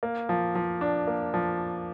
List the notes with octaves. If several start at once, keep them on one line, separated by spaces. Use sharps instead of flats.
A#3
F3
F3
D4
A#3
F3